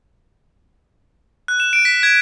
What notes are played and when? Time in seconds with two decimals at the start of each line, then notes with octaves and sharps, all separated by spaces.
1.48 F#6
1.60 E7
1.73 D7
1.85 B6
2.03 G#6